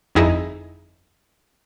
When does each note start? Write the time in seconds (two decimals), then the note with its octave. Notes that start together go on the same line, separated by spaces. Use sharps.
0.15 G1 F2 D#4 E4 G#4 D#5